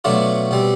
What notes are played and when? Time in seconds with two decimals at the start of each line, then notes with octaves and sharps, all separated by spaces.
0.04 B2 F#3 A3 D4 F4
0.51 B2 G3 C4